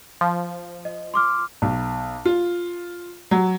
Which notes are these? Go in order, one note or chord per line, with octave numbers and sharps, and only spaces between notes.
F3
D#5
C6 D6 F6
B1
F4
F#3